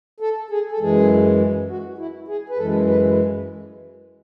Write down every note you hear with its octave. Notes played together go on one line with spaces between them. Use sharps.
A4
G#4
A4
F#2 E3 G#3 G#4
F#4
E4
G#4
B4
F#2 E3 G#3 A4
B4